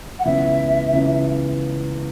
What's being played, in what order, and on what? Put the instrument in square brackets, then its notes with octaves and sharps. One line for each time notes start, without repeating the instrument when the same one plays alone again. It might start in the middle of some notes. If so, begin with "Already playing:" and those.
[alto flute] F#5
[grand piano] C#2 C#3 E3 B3 [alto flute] E5
[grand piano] C#2 C#3 E3 B3